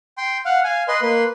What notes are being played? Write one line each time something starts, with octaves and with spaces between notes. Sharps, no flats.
G5 C6
F5 F#5
F5 G#5
B4 D#5 C6
A#3 B4 C6